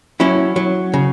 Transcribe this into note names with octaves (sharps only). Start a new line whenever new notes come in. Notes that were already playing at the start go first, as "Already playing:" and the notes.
F#3 C#4 E4
F#3
C#3